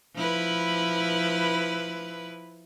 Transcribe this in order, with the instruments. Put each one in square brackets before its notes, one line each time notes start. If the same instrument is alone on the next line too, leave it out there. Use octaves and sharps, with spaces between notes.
[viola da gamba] F3 E4 B4